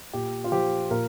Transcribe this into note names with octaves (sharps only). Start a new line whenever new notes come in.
A#2 G4
F4
F3 G4
A#2 A#4